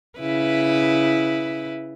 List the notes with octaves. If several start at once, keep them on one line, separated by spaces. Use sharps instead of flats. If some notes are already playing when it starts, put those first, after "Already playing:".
C#3 E4 B4